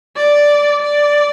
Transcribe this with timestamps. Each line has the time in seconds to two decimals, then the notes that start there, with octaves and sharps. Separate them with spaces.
0.16 D5
0.82 D5